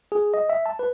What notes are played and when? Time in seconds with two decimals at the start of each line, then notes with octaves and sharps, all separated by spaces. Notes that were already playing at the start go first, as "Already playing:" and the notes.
0.12 G#4
0.34 D#5
0.49 E5
0.66 A5
0.79 B4